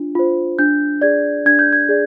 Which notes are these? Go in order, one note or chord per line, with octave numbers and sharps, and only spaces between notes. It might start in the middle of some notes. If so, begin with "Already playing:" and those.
Already playing: D4 F4
F4 C5
D4 G6
G#4 D5 G#6
D4 G#6
G6
G#6
G#4 D5